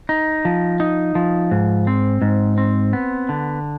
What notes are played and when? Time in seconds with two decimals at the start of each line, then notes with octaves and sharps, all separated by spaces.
0.09 D#4
0.45 F3
0.80 D#4
1.15 F3
1.51 G#2
1.87 C4
2.22 G#2
2.58 C4
2.93 B3
3.29 D3